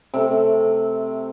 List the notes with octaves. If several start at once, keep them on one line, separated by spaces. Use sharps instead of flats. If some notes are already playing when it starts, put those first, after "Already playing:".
C3 A3